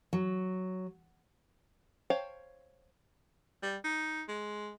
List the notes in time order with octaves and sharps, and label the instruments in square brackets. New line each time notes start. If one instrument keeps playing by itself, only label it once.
[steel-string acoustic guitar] F#3
[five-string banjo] C5 C#5 F5 G5 A5
[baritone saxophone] G3
D#4
G#3